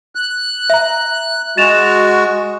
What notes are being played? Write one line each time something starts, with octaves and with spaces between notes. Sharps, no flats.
F#6
E5 A#5
G#3 F#4 A6 E7 F7